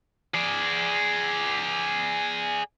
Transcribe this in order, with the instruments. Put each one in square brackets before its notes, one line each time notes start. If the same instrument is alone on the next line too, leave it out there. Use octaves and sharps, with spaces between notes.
[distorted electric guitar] G#4 D5